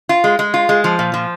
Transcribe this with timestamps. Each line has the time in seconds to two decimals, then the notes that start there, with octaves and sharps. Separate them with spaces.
0.09 F4
0.24 G#3
0.39 G#3
0.54 F4
0.69 G#3
0.84 F3
0.99 A#2
1.14 F3